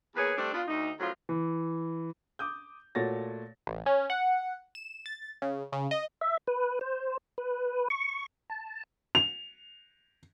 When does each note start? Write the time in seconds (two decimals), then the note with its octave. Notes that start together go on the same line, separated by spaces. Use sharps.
0.16 E2 A#3 G#4 B4 C#5
0.38 G3 A3 C4 D4
0.54 B3 D4 F4
0.68 D2 D#4
1.00 F#2 A2 F3 F#3 F4
1.29 E3
2.39 D6 D#6 G6
2.95 A#2 A3 F#4 C#5 A6 A#6
3.67 A1
3.86 C#4
4.10 F#5
4.75 E7
5.06 A6
5.42 C#3
5.72 C#3
5.91 D#5
6.21 E5
6.48 B4
6.81 C5
7.38 B4
7.90 C#6
8.50 A5
9.15 F7